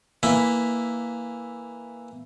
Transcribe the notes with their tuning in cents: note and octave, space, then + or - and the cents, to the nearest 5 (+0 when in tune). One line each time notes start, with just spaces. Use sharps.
E3 +0 A#3 +0 E5 +0